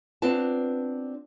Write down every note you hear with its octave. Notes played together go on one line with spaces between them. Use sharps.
B3 C4 D4 F4 B4 A5